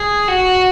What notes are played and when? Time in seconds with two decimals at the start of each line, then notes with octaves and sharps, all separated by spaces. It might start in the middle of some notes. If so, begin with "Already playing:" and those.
Already playing: G#4
0.28 F#4